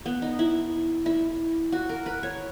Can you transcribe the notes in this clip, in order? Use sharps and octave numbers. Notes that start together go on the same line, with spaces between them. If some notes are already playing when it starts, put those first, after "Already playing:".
B3
D#4
E4
E4
F#4
A#4
B4
C#5